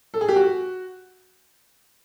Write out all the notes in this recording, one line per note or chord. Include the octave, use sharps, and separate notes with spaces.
A4
G#4
G4
F#4